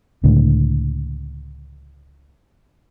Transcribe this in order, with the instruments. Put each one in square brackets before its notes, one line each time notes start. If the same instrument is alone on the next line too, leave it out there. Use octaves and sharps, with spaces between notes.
[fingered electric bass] C#2 A2 D3